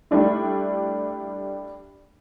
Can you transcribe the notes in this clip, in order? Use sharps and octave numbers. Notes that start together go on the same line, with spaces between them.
G3 A3 D4 E4